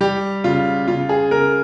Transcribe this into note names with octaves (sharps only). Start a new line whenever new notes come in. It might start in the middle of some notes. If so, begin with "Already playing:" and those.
G3 G4
C#3 F4
C#3 F4
G#4
C#3 A#4